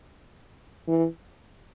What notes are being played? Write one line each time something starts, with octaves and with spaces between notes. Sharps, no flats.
E3